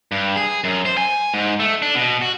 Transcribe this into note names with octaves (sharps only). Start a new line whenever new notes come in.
G2
G#4
F#2
C5
G#5
G#2
A3
D4
B2
F#4